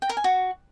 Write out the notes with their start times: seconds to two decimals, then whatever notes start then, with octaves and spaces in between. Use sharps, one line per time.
0.02 G5
0.09 A#4
0.17 G#5
0.24 F#4